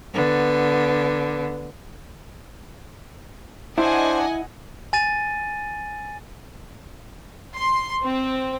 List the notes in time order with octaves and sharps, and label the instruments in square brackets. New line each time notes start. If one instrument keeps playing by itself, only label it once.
[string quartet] D3 B3
[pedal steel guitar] D4 [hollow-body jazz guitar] E4 [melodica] C5 [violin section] D#5 F#5 G#5
[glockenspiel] G#5 A6 D#7
[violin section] C6
C4